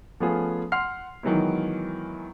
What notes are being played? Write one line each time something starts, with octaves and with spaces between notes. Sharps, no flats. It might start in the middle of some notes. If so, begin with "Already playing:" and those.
F3 A3 B3 C#4 F4 G#4
F#5 C6 F6 C7
D#3 E3 F#3 G#3 B3 E4